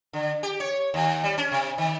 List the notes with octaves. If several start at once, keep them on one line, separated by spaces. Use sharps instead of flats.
D3
G4
C#5
D#2
G3
C#4
C3
D#3